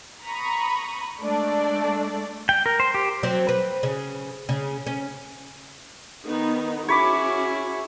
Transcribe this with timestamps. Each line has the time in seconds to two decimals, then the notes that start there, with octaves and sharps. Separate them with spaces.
0.24 A#5 B5 C#6 D#6
1.22 G#3 A3 D4 D5
2.49 G5
2.66 A#4
2.80 C5
2.95 G4
3.23 F#3 C4
3.49 B4
3.83 C#3
4.49 C#3
4.87 C#4
6.26 D#3 B3 D#4
6.89 C#4 E4 F#4 G#4 C#5 B5 D6